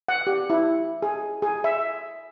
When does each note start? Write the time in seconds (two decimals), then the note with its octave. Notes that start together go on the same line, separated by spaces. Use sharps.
0.08 F#5
0.27 G4
0.50 E4
1.02 G#4
1.42 G#4
1.64 E5